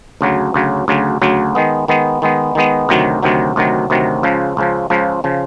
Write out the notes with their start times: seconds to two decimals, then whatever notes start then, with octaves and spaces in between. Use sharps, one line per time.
0.21 D2 C#3 F#3
0.54 D2 C#3 F#3
0.88 D2 C#3 F#3
1.22 D2 C#3 F#3
1.55 D#3 G#3 B3
1.88 D#3 G#3 B3
2.22 D#3 G#3 B3
2.55 D#3 G#3 B3
2.89 D2 C3 D#3 F#3
3.23 D2 C3 D#3 F#3
3.56 D2 C3 D#3 F#3
3.90 D2 C3 D#3 F#3
4.23 C#2 C#3 F3
4.57 C#2 C#3 F3
4.90 C#2 C#3 F3
5.24 C#3 F3